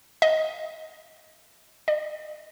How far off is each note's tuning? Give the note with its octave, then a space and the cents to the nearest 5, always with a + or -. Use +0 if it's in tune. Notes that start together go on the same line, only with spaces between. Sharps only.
D#5 +20
D#5 -40